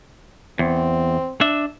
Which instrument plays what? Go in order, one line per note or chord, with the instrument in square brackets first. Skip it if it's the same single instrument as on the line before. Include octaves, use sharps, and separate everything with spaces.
[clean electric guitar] E2 [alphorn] C4
[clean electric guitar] D4 E5